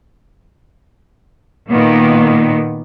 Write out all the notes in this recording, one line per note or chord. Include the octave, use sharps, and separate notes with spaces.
A#2 D#3 A#3 B3